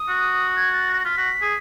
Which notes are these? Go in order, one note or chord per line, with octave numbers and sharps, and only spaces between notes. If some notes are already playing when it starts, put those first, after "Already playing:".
Already playing: D#6
F#4
G#6
A6
A#6
F4 B6
F#4
G#4